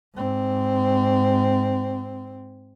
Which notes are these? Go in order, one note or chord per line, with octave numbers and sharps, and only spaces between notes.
G#2 C4